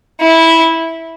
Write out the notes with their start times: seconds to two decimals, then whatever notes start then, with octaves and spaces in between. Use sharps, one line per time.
0.20 E4